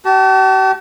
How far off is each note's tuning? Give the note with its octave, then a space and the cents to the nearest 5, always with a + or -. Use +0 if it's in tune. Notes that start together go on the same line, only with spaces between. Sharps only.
G4 -45 A5 +0